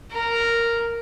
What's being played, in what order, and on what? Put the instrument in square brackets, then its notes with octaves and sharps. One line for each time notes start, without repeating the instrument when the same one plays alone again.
[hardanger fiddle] A#4